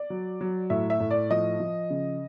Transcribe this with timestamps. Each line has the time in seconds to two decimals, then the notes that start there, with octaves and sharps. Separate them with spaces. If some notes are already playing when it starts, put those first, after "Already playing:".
Already playing: D5
0.10 F#3
0.41 F#3
0.70 A2 E5
0.90 E5
1.00 A2
1.11 D5
1.31 F3 D#5
1.60 F3
1.90 C#3